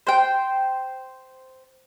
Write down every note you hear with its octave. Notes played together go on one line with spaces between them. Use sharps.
C5 G5